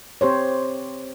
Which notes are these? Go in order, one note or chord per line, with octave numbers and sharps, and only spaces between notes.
C4 G4 C5 C#5